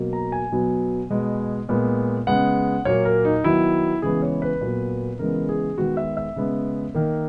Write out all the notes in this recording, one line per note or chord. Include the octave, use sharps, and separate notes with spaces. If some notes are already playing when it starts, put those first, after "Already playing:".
Already playing: B2 F#3 A#3
A#5
G#5
B2 F#3 B3
B2 G#3 B3
A#2 G#3 B3
C#3 G#3 B3 F#5
A#2 F#3 A#3 C#5
A#4
D#4
D#3 F#3 B3 E4
C#3 E3 G#3 B3 G#4
C#5
B4
A#2 F#3 B3
C#3 E3 G#3 B3 A#4
G#4
D#3 G#3 B3 F#4
E5
E5
C#3 G#3 B3
D#3 A#3